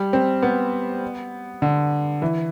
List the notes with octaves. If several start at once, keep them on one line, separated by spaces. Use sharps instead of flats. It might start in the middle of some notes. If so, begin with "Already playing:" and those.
Already playing: G3
C4
B3
D3
E3